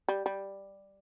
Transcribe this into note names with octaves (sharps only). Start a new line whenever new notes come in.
G3
G3